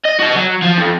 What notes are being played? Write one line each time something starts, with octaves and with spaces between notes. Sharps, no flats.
D#5
F#4 D#5
F#3
F3
F2